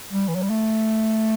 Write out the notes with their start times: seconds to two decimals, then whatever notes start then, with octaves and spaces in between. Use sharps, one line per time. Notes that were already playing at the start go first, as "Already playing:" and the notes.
0.13 G3
0.28 E3
0.36 F#3
0.42 G3
0.50 A3